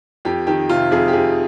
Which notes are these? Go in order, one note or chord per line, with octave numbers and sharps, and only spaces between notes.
F2 G4
D#3 G4
C3 F4
F2 G#4
G4
F2 G#4